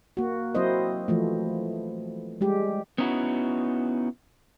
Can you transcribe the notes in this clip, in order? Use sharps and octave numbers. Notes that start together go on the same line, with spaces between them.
A#3 F#4
F#3 C4 E4 C5 D#5
E3 F3 A3
G3 G#3 G4
B3 C#4 D#4 E4 F#4